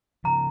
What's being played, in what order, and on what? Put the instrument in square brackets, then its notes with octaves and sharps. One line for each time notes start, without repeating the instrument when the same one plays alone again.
[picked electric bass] C#3 F3 [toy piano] A#5